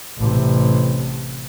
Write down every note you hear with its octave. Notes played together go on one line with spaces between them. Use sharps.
A1 C3